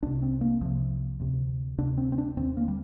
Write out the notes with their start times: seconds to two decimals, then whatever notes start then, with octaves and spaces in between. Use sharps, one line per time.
0.03 C2 C3 D4
0.22 C4
0.41 A#3
0.61 C2 C3 F3
1.20 D2 C3
1.78 D2 C3 D4
1.97 C4
2.12 C4
2.18 D4
2.37 D#2 D3 C4
2.57 A#3
2.68 G3